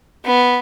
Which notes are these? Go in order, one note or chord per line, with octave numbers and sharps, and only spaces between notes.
B3